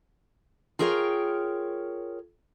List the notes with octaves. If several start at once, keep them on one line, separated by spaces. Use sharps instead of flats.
F4 G#4 A#4 C#5 G5